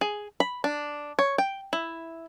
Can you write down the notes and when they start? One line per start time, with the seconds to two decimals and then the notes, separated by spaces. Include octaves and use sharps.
0.01 G#4
0.40 B5
0.64 D4
1.19 C#5
1.38 G5
1.73 E4